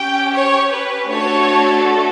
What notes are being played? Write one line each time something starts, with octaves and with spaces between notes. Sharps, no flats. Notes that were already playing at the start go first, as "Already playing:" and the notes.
Already playing: C#4 G4 G5
C#5
B4
A3 D4 F#4 A4 C#5